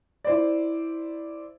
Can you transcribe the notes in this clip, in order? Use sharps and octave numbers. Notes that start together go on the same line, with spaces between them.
E4 C5 D5